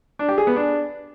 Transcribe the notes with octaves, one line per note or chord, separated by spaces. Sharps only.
D4
G4
G#4
B3
D4